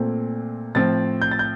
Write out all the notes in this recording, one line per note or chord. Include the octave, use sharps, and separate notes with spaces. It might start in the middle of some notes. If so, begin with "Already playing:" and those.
Already playing: A#2 A3 C4
A2 F3 C4 A6
G6
A6
G6